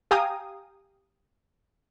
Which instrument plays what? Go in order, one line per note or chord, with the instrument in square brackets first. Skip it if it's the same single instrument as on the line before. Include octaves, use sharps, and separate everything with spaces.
[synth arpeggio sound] G4 F5 G5 G#5 A#5 D#6